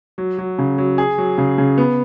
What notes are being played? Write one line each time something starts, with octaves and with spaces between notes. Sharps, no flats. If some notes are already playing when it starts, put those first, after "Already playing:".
F#3
F#3
C#3
F#3
G#4
F#3
C#3
C#3
B3